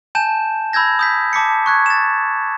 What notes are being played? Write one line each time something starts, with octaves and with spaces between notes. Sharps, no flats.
G#5 A5 G6 E7
B5 E6 G6 G#6 A#6
D#6 G6 B6
A5 D6 B6 C#7
C#6 F#6 G#6
A6 E7